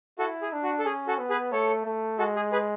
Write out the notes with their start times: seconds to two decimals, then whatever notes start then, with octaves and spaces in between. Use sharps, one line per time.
0.19 E4 F#4 A4
0.42 G#4
0.52 D4
0.63 F#4
0.79 A4
0.85 C#4 G#4
1.07 F#4 A4
1.18 B3
1.30 G#4 B4
1.52 A3 A4 C#5
1.85 A3
2.19 G#3 F#4 A4
2.36 G#4
2.52 G#4 B4